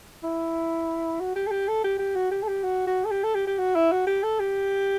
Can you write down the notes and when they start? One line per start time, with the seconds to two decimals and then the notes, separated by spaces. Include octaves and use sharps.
0.23 E4
1.20 F#4
1.36 G4
1.47 A4
1.51 G4
1.68 A4
1.84 G4
1.99 G4
2.16 F#4
2.31 G4
2.43 A4
2.48 G4
2.64 F#4
2.87 F#4
3.05 A4
3.11 G4
3.24 A4
3.35 G4
3.47 G4
3.59 F#4
3.75 E4
3.92 F#4
4.07 G4
4.23 A4
4.40 G4